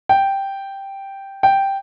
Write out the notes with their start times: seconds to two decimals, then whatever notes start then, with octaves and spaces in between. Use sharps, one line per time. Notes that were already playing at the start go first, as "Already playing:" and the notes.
0.09 G5
1.43 G5